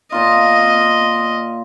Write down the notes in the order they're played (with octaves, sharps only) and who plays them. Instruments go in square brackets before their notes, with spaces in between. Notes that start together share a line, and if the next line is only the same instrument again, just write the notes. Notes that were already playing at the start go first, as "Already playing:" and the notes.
[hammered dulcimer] A#2 F4 [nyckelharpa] D#5